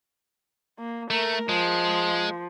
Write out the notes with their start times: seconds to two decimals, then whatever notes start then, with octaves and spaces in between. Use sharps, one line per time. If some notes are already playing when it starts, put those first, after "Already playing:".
0.79 A#3
1.10 A3 A#4
1.49 F3 G#3